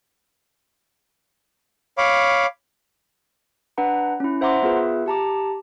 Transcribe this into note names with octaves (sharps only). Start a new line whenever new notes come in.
C#5 F5 B5 D6
D4 B4 F#5 A#5
C#4 E4
C5 E5 F#5 A#5 C6 D6
B3 F4 G#4 B4 E5
G4 A5 A#5 D6